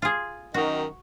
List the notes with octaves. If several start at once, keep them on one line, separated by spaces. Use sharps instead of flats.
F4 G#4
F#2 D#3 F#4